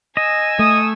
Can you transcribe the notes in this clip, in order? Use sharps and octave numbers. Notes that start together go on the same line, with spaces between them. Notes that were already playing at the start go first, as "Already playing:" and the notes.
D#5 G#5 E6
A3 D#6